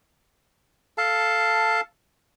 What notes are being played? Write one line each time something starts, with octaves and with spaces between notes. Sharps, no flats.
A4 F5 A5